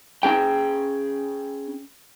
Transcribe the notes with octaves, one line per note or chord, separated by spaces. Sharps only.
C#4 G#4 G5